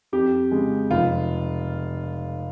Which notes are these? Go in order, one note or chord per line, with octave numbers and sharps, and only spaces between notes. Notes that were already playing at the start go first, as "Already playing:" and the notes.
F2 G4
C#3 G#3
F1 F4